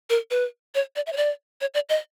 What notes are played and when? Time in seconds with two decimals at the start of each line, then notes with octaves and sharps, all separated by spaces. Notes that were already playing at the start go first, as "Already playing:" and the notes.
0.10 A#4
0.31 B4
0.75 C#5
0.96 D5
1.07 E5
1.13 C#5
1.17 D5
1.61 C#5
1.74 D5
1.89 D#5